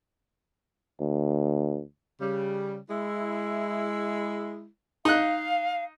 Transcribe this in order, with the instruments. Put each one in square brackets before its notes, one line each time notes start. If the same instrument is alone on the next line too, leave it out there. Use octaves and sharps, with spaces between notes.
[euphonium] D2
[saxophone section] C#3 G3
G#3 E4
[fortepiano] D#4 F#6 [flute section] F5